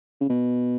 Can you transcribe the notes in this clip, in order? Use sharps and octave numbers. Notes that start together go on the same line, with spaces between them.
C#3
B2